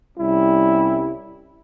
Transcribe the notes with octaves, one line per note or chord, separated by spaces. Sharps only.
C2 G3 C#4 E4